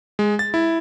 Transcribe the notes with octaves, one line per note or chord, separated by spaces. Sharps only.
G#3
A6
E4